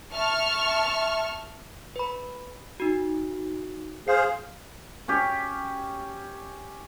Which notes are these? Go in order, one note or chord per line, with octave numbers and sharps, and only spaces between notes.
E5 A5 C#6 F6
B4 B5
D#4 F#4
G#4 C5 F5 C7
C#4 G4